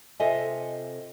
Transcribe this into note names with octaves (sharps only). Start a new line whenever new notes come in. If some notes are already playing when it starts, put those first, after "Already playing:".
C3 F4 A4 D#5 E5 G#5